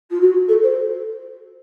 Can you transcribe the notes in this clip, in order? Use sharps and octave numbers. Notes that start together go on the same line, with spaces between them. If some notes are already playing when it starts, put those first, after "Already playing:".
F4
F#4
A4
C5